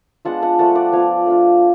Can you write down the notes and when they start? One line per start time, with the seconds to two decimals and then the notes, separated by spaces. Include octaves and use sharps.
0.25 G#3 B3 D4 F4 F#5 A5
0.42 F#5 A5
0.59 F3 A3 D4 F4 F#5 A5
0.75 D5 F#5
0.92 F3 B3 F4 F5 G#5
1.26 A3 D4 F4